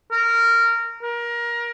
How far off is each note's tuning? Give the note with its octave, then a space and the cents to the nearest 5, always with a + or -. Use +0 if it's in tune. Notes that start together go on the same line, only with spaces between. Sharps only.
A#4 -15
A#4 +25